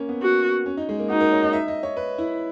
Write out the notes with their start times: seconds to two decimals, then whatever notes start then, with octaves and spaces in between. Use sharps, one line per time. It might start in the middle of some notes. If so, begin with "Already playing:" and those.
Already playing: A#3 C#4
0.09 B3
0.22 F#4
0.66 C#4
0.77 D#4
0.89 G#3
0.99 A#3
1.10 D#4 F#4
1.20 A#4
1.32 C#5
1.43 D#5
1.53 E5
1.68 D#5
1.83 C#5
1.97 B4
2.18 E4